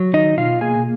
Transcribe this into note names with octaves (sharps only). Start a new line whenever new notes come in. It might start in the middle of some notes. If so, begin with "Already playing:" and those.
Already playing: F#3
D#3 D#4 D#5
B2 F4 F5
A#3 G#4 G#5